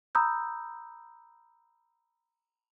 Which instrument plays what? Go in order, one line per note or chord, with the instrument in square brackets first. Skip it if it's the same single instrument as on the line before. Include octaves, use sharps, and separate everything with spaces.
[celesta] A#5 B5 D#6 E6 G6